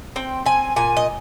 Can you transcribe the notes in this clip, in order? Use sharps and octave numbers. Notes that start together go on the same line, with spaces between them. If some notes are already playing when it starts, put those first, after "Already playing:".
C4 G5
C4 G#5
A#2 G#5
D#5